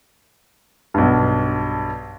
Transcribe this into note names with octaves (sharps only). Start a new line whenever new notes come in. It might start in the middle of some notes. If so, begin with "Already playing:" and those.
B1 G2